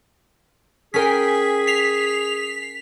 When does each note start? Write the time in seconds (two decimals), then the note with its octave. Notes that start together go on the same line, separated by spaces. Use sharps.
0.94 C#4 G#4 A#4 G5 G#5 B6
1.67 B6 C7 F7